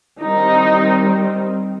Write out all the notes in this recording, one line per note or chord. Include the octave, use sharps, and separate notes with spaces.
D#3 G3 C4 D#4